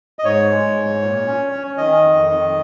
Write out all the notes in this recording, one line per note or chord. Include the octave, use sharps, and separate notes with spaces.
D#5
G#2 C#5
G#3
G#2
A#2
C#4
C#4
D#3 D#5
F2
D#3